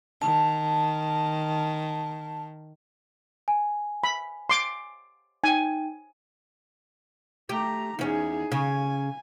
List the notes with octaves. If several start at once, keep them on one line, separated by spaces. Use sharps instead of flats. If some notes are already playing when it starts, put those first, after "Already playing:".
D#3 A5
G#5
B5
C6 D6
D#4 G5 G#5
A3 G4 A#5
E2 C#4 D#4 G#4
C#3 G#5